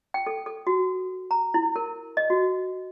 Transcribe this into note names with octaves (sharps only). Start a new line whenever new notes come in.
G5
A4
A4
F#4
A#5
E4
A#4
D#5
F#4